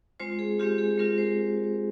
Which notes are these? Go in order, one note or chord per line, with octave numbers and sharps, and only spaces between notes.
G#3 C4 F4 C5
G#4
G#3 C4 F4 G4
G#4
G#3 C4 F4 A#4
C5